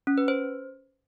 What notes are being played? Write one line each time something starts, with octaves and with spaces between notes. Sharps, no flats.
C#4
B4
C5